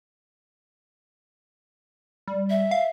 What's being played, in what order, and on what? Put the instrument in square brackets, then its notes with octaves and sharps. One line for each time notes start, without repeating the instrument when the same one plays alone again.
[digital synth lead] G3
[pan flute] E5
[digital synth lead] F5